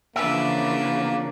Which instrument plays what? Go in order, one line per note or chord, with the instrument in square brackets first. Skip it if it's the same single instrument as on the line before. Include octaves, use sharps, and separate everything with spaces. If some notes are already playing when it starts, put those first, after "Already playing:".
[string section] C#3 E3 F3 [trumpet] A#3 [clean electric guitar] B3 E5 [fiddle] D4 B4